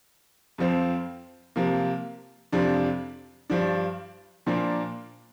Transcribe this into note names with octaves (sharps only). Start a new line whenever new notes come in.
F2 F3 C4
C3 F3 A#3
F2 C3 F3 D4
G2 F3 D4
A#2 F3 A#3 D4